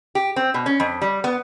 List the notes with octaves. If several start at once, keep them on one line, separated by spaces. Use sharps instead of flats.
G4
C4
B2
C#4
F2
G3
B3